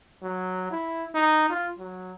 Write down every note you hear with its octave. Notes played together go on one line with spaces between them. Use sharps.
F#3
E4
D#4
F4
F#3